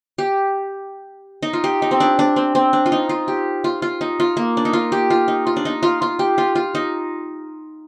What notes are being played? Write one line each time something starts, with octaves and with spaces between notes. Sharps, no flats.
G4
D#4
F4
G4
D#4
C4
D4
D4
C4
C4
D4
F4
D#4
F4
G4
F4
F4
D#4
F4
A#3
D4
D#4
F4
G4
F4
D#4
F4
D4
D#4
F4
F4
G4
F4
F4
D#4